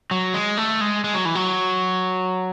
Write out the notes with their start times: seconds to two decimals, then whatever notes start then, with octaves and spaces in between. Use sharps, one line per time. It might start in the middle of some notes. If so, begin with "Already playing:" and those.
0.11 F#3
0.34 G#3
0.58 A3
0.81 G#3
1.04 G#3
1.15 F#3
1.25 E3
1.35 F#3